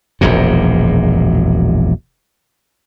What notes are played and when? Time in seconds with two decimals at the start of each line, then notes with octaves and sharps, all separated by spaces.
0.21 E1 A#1 F#2 A#2